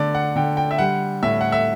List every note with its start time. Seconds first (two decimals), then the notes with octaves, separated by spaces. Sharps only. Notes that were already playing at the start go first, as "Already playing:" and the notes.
Already playing: D3 A3 D5
0.15 F#5
0.36 D3 G5
0.57 G5
0.71 E5
0.78 G3 F#5
1.23 A2 E5
1.41 F#5
1.52 E5